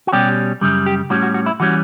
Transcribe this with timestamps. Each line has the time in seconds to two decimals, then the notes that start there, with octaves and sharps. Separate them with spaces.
0.07 F#4
0.12 B2 G3 C#4 G4
0.61 F#2 C#3 G3
0.86 G4
1.10 A2 G3 C#4 F#4
1.23 F#4
1.34 F#4
1.46 E4
1.60 E3 G3 C#4 F#4